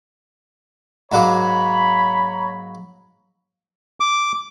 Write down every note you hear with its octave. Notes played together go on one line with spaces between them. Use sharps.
G#2 F#3 A#3 C#5 A#5 B5
D6